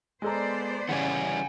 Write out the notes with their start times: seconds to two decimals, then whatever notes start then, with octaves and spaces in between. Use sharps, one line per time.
0.22 G#3 B3 A4 C5 D5 A#5
0.89 C#3 E3 G3 C#4 F#5 G#5